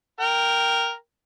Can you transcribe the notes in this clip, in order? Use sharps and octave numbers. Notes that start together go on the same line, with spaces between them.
A#4 G5